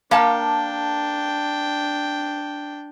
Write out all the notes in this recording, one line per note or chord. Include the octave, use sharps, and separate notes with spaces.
A#3 D4 F5 G5 A5